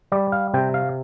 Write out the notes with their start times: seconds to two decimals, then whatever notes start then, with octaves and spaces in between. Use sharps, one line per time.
0.12 G3 D5
0.32 F5
0.54 C3 G5
0.74 F5